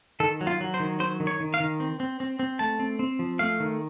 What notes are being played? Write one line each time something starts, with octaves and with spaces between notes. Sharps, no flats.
D#3 A4
F#3
F4
F#3
C5
D#3
F#3 C5
D#3
C#5
D#3
F5
D#3
C4
C4
C4
C4
A3 A5
C4
C4
F3
A3 F5
D#3